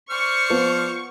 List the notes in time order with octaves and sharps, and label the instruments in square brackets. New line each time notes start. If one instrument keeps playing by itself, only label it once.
[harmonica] C5 D5 F6 [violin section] C#6
[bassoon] F3 [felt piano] B3